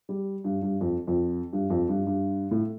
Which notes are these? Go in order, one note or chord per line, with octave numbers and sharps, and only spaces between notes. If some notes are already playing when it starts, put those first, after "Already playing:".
G3
G2
G2
F2
F2
G2
F2
G2
G2
A2